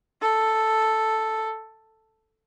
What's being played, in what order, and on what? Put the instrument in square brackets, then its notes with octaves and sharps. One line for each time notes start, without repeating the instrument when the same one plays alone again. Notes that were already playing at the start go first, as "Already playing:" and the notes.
[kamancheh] A4